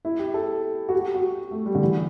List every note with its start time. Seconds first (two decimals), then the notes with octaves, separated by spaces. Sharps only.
0.05 E4
0.19 G4
0.34 A4
0.89 F#4
0.93 G4
1.14 F#4
1.51 A3
1.66 G3
1.75 D3
1.81 E3